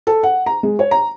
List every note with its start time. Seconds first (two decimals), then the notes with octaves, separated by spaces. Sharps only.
0.07 A4
0.23 F#5
0.46 A#5
0.63 G#3
0.79 C#5
0.91 A#5